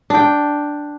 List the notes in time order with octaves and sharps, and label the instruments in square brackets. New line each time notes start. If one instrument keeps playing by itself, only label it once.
[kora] D4 G5